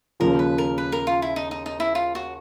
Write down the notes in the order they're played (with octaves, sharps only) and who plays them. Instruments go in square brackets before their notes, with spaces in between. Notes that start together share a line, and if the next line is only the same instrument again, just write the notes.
[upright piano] D#2 C#3 F3 [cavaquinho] A#4
[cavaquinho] B4
A#4
B4
A#4
F4
E4
D#4
D#4
D#4
E4
F4
F#4